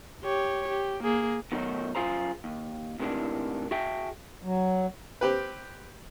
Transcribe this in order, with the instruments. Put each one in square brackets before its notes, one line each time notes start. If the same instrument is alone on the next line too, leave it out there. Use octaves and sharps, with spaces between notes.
[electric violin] G4 C#5
G4
A#3 G#4
[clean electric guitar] B2 D#3 F#3 A3 D#4 F#4
F#2 B2 F4 G#4 C5 A#5
D#2
A2 C3 D#3 E3 G#3 D4
F#4 G#4 E5 G5 A5
[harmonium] F#3
[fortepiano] C4 G4 B4